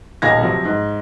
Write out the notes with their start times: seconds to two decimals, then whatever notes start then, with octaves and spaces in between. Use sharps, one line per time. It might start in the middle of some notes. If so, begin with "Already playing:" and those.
0.22 D#1 B1 F5 G#6 A#6
0.42 C3 F3 F#3
0.65 G#2